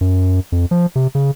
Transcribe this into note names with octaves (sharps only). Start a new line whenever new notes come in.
F#2
F2
F3
C3
C#3